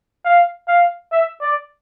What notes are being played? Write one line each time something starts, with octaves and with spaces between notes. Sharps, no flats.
F5
F5
E5
D5